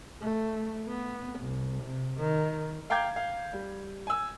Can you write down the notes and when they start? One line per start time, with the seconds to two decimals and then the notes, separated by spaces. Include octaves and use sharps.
0.22 A3
0.89 B3
1.39 C2
1.84 C3
2.17 D#3
2.90 F5 G5 A#5 D6 G6 G#6
3.16 F5
3.53 G3
4.07 G#5 E6